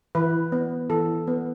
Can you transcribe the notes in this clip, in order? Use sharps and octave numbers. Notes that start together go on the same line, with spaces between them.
E3 B4
B3
E3 A4
B3